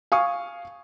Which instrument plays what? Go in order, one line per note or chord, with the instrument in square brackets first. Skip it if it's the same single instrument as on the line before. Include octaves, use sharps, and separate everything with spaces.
[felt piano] F5 G#5 C#6 D#6